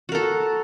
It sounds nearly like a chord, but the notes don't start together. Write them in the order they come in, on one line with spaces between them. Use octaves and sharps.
F#4 A#4 A4